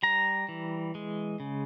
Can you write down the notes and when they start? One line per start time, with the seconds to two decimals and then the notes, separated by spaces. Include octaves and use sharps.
0.03 G3 A#5
0.49 E3
0.95 G#3
1.40 C#3